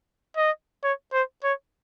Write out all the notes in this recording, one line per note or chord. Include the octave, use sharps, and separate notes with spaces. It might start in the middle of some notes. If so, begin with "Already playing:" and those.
D#5
C#5
C5
C#5